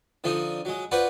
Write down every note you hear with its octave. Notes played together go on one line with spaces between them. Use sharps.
D3 F3 C4 D#4
F#3 G#3
F4 F#4 B4 C5 D5 F#5